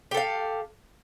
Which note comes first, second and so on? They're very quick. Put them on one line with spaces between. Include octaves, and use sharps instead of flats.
G4 A4 F5